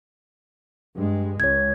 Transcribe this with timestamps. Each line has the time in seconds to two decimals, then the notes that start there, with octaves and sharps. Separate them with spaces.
0.95 G2 G#3
1.40 C#2 C#5 G#6